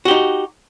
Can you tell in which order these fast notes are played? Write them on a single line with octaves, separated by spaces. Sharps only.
F#4 G4 D#4